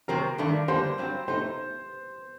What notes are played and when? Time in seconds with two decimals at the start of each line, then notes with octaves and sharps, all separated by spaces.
0.08 C3 F#3 C4 A#4
0.38 G2 D#3 A3 D4
0.68 D3 G3 A#3 D4 C5
0.98 G2 F#3 C4
1.28 A2 A3 D#4 C5